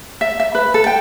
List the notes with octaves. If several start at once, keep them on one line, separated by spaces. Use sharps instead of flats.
E5
E5
B4
A4
G5